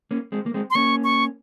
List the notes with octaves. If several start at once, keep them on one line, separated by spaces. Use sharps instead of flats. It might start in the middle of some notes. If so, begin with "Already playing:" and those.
A#3 C#4
G#3 C4
A#3
G#3 C4
C6
A#3 C#4 C#6
C#6